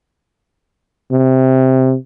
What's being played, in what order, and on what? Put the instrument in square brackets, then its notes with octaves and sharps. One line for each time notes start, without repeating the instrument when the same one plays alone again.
[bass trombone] C3